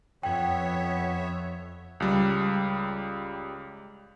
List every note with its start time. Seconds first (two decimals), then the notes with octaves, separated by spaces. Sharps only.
0.23 F2 B3 C#5 E5 G5
2.00 C#2 G3